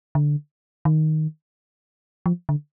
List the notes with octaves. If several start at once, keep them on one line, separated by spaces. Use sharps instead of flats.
D3
D#3
F3
D3